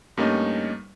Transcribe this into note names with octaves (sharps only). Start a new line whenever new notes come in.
G2 G3 A3 A#3 C#4 D#4